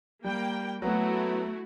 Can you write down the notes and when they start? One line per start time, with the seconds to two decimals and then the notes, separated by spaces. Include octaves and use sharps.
0.24 G3 A#3 G5
0.82 F#3 A3 B3 E4 F#4